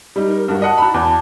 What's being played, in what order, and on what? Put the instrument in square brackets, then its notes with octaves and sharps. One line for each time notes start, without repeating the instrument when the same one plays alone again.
[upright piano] G3 D#4
[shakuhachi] A#4
[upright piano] G2 F#4 [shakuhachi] A#4
[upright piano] D#5 F#5 [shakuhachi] A5
[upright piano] F#4 B5
E2